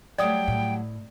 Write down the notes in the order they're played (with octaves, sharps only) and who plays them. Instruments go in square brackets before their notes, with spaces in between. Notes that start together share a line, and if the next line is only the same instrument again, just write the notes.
[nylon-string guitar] F#3 G3 A3 [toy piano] D5 D#6 [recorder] G5
[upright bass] A2